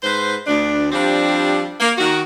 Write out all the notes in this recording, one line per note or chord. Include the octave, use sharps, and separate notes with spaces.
G#2 B4 C5
D2 D4
F3 G3 C4 D4 G4
A#3
D#3 F#4